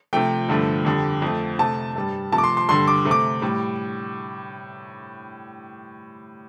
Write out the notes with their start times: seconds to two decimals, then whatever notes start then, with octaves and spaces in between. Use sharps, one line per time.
0.13 C3 F3 A3 G5
0.49 G2 D3 F3 A3
0.85 F2 D3 G3
1.22 F2 F3 A3
1.59 C3 A3 A5
1.96 G2 G3
2.32 C3 F3 A3 A5
2.38 D6
2.44 C6
2.57 C6
2.69 G2 D3 G3 C6
2.88 D6
3.05 C3 A3
3.11 D6
3.42 A2 G3